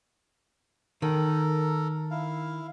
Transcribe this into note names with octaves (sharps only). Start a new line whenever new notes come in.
D#3 A4 A#4
E4 F5